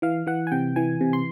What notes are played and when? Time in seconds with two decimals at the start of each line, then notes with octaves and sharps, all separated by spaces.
0.02 E3 F5
0.27 E3 F#5
0.47 G#5
0.52 C3 G5
0.76 E3 G#5
1.01 C3
1.13 C6